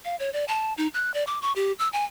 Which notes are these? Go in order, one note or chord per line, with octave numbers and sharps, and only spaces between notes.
F5
C#5
D5
A5
D#4
F#6
D5
D6
C#6
G4
E6
G#5